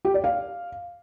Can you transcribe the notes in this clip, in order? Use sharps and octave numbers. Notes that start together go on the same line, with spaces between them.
G4
D5
F5